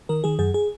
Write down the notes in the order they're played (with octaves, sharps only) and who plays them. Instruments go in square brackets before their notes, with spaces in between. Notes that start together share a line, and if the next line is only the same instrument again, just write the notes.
[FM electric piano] D#3 A#4
D#3 G#4
F#2 G#4
G#4